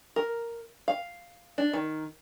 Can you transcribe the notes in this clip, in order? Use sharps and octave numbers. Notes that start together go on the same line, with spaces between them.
A#4
F5
D4
D#3